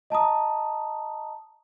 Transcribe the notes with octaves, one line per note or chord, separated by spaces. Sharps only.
D#5 A5 A#5 D#6